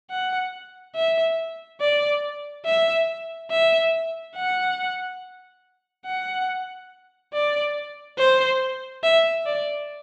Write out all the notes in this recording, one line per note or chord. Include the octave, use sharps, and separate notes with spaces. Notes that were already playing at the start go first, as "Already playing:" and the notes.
F#5
E5
D5
E5
E5
F#5
F#5
D5
C5
E5
D5